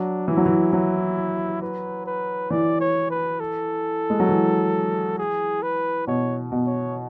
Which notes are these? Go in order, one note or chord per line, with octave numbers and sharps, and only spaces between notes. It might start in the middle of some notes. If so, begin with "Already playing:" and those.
Already playing: F#3 D4
E3 E4
F#3
E3
F#3
B4
B4
E3 D5
C#5
B4
A4
G#3
F#3
E3
G#4
B4
B2 C#5
B2
C#5